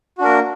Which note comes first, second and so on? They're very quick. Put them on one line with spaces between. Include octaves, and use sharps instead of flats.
F#4 D4 A#4 A#3